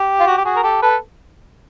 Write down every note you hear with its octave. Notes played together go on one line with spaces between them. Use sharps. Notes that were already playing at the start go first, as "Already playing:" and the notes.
Already playing: G4
F4
F#4
G4
F#4 G#4
A#4
G4 A4
A4 B4